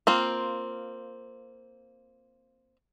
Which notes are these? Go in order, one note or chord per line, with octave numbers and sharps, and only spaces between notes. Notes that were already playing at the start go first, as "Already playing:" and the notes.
A#3 C4 F4